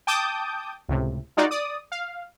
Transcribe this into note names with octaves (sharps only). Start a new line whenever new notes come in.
G5 A5 D6 D#6 G6
C#2 A2 C3
G#3 D#4 F4 F#4 D5
D5 D#6
F5